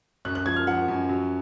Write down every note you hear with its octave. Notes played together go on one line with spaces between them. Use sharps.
F#2 F#6
F#6
F3 G#6
F6
F3 F#5
F#2
F#3